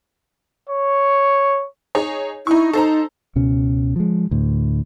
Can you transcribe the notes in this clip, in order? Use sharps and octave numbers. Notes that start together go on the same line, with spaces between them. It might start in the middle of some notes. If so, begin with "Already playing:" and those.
C#5
D#4 G#4 C#5
D#4 E4 C#6
D#4 A4 C5 A#5
C#2 B2 C#4
F3 G#3
D2 A2